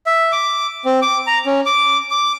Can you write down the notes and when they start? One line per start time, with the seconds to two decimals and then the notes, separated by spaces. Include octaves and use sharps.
0.06 E5
0.32 D6
0.85 C4
1.02 D6
1.27 A#5
1.46 C#4
1.66 D6
2.11 D6